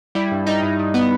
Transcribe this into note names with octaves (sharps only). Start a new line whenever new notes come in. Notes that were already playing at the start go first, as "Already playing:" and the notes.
G3 E4
G2
G3 D#4
G2
G2
B3